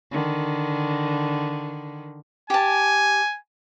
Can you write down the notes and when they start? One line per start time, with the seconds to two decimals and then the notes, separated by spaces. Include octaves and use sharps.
0.11 D3 D#3
2.50 G4 G#5 A5